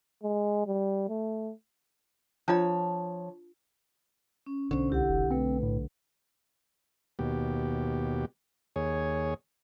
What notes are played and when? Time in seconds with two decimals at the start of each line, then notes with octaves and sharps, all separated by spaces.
0.23 G#3
0.66 G3
1.09 A3
2.48 F3 D4 F4 C#5 A#5
4.46 C#4
4.71 B1 D3 C#4 C5
4.90 C#2 E4 G4 F#5
5.09 F1
5.30 A3 C4 B4
5.63 A2
7.19 D#2 B2 G4
8.76 D#2 G#4 C#5